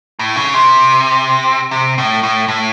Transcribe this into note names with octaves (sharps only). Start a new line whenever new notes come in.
A2
C#3
C3
C3
A2
A2
A2